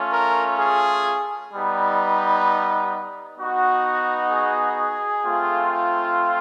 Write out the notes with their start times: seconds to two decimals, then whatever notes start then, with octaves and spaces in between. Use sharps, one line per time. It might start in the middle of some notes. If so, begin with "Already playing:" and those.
Already playing: A3 C#4 F4
0.13 A#4
0.59 G#4
1.52 G3 B3 D#4
3.39 B3 D#4 F#4
4.31 G#4
5.25 A3 C4 F4